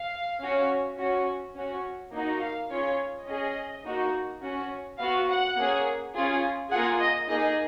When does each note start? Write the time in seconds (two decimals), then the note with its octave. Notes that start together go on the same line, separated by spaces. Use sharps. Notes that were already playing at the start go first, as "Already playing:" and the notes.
Already playing: F5
0.41 C#4 F#4
0.98 C#4 F#4
1.55 C#4 F#4
2.12 A#3 D#4 F#4
2.41 F5
2.70 C#4 F4 G#4 C#5
3.27 C#4 G#4 D#5
3.84 A#3 D#4 F#4
4.42 C#4 F#4
4.99 B3 F#4 F5
5.28 F#5
5.57 A#3 C#4 G#4
6.13 C#4 F4 G#4
6.71 A#3 F4 G#4 F#5
6.99 D#5
7.28 A#3 D#4 G#4 D#5